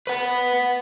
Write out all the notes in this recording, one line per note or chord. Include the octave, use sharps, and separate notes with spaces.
B4 F#5